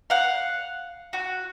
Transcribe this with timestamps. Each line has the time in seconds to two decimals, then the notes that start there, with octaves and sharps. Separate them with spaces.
0.10 F5 F#5
1.13 F#4